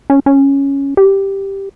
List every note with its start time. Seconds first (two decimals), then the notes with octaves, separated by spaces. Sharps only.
0.10 C#4
0.26 C#4
0.97 G4